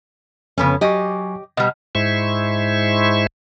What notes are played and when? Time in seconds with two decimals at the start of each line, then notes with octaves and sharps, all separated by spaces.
0.58 F2 C#3 B3 C#4 A4 C#5
0.81 F#3 G4 D#5 G#5 C#6
1.57 B2 G3 D#5 F#5 F6
1.95 G#2 G#3 E4 C5 E5 C#6